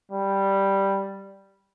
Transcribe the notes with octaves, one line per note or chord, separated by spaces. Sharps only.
G3